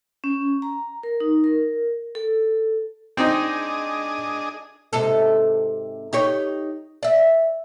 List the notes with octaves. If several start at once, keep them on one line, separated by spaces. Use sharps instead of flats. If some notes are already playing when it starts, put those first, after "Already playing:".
C#4
A#5
A#4
D#4
A#4
A4
C4 D4 D#4 G#4 D#5
G#2 C3 A4
D#4 G4 C#5
D5 E5